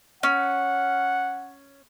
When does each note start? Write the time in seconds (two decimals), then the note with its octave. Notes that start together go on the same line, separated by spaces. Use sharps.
0.23 C#4 F#5